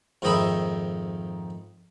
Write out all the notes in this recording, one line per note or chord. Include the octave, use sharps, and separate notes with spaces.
F2 G#2 D#3 D#5 E5 B5